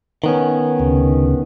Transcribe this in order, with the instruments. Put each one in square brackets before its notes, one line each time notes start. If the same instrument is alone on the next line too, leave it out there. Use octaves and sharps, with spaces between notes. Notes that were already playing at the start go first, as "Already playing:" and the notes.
[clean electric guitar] D#3 B3 C#4
[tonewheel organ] D2 C#3